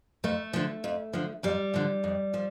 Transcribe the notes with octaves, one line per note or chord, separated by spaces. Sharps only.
F2 A3
D3 F3
F2
D3 F3
F2 G3
D3 F3
F2
F3